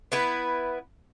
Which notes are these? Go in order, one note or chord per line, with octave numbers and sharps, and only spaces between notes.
B3 E4 B4